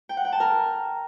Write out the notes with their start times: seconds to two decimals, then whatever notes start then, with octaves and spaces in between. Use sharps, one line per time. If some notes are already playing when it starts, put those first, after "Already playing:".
0.09 G5
0.17 F#5
0.25 G5
0.32 A5
0.40 A#4